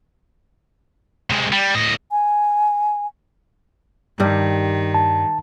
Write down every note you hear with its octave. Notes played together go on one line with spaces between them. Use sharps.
C3 G#3
G3
A2 D#5
G#5
G2 D#3 G3
A5